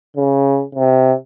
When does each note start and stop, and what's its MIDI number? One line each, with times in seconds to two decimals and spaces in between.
0.17 0.62 49
0.75 1.14 48